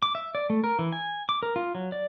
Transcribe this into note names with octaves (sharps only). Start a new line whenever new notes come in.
D6
E5
D5
A3
A#4
E3
G#5
D6
A#4
F4
F#3
D5